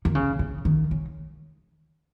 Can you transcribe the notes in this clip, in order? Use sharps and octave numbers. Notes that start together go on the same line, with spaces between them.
D#3
C#3
C#3
D#3
C#3